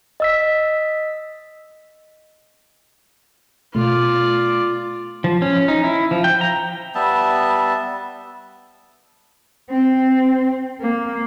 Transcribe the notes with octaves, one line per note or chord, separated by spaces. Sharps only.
D#5 E6 B6
B2 A3 F4 D5
F3
C#4
D#4
E4
F3
G5
A#5
G3 B3 E5 A5
C4
A#3